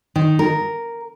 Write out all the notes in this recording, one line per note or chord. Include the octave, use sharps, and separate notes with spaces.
D#3
A#4